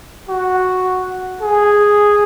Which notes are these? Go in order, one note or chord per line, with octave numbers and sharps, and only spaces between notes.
F#4
G#4